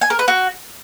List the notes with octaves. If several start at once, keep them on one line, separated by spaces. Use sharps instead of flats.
G#5
A#4
B4
F#4